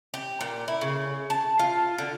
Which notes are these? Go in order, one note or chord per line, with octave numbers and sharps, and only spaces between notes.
G4
A#2
E4
C#3
A5
F4
D3